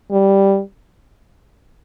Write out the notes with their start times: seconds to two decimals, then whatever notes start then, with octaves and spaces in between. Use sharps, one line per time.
0.11 G3